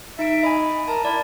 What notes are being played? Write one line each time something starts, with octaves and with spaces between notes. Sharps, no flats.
D#4 E5 D7
D#5 G#5 B5
A#4 A5
E4 D5